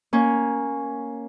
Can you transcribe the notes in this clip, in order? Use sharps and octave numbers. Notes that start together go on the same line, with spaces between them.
A#3 C#4